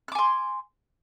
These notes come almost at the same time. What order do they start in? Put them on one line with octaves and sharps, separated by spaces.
F#6 D6 G#5 C6